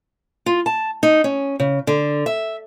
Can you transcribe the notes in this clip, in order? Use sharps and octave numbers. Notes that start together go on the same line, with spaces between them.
F4
A5
D#4
C#4
C#3
D3
E5